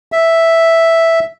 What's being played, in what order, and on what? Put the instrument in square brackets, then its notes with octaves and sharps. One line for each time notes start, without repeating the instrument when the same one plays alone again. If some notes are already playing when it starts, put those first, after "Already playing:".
[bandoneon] E5